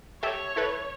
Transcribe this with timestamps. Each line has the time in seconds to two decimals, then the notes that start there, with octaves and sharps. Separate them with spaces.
0.23 G4 A4 C#5 E5
0.56 E4 A4 B4